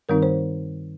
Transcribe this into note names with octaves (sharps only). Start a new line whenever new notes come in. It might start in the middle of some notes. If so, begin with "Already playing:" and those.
G2 D#3 G3 C4 D#4 A#4
C5